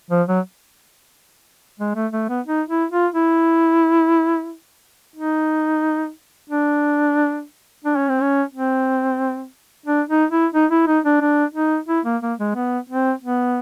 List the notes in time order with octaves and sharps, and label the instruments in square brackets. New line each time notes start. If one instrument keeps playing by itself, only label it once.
[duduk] F3
F#3
G#3
A3
A3
B3
D#4
E4
F4
E4
D#4
D4
D4
C#4
C4
C#4
C4
D4
D#4
E4
D#4
E4
D#4
D4
D4
D#4
E4
A#3
A#3
G#3
B3
C4
B3